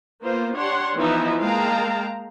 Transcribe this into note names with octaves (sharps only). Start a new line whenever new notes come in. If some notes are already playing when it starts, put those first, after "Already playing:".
A#3 B3 F4 C5
D4 G4 C#5 F#5 C6
E3 F3 B3 D#4 E4 E5
G#3 A#3 F5 G5 A5 A#5